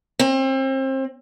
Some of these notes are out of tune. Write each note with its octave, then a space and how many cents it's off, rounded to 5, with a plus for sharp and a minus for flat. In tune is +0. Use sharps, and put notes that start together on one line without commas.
C4 +30